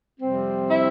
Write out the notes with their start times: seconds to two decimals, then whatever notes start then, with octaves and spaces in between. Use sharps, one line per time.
0.21 F2 C3 G3 C4
0.70 E4 E5